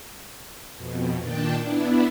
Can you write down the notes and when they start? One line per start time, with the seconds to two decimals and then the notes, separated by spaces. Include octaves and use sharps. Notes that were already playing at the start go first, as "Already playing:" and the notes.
0.77 F2 B2
1.17 A#2 D#3 D4 G5 A5
1.59 B3 D4 E4